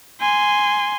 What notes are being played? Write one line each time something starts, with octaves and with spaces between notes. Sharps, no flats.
G#5 C6